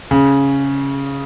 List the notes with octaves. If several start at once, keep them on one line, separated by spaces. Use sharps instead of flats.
C#3